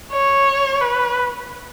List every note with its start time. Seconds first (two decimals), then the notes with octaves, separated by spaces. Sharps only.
0.11 C#5
0.81 B4